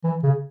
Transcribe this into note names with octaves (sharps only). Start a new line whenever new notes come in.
E3
C#3